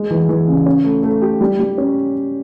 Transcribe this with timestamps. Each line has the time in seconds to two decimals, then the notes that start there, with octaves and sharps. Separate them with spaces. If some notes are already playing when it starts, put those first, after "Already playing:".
Already playing: G#3
0.11 E3
0.29 E3
0.48 C#3
0.66 C#4
0.84 A3
1.03 A3
1.22 G4
1.41 G3
1.59 G3
1.78 C#4